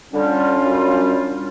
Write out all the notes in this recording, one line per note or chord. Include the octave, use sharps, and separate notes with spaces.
D3 G3 C#4 D4 F4
F#2 G3